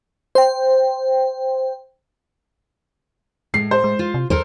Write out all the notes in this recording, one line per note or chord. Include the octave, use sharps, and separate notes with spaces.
C5 G5
A2 G#3 C7
C5
G#3
F4
C3
D#2 A4 A#4 C5